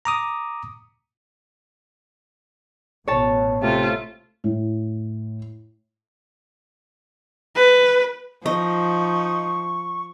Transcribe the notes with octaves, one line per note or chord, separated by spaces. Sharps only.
A#5 D6 D#6
A1 B2 C#5 A5
C3 A3 F4
A2
B4
F3 D#4 D#5 C#6